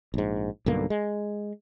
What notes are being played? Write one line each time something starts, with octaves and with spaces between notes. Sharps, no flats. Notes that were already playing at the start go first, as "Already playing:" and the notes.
A#1 G#2
B1 G2 D3 A#3
G#3